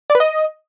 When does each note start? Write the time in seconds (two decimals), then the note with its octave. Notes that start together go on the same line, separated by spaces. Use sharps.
0.10 D5
0.15 B4
0.20 D#5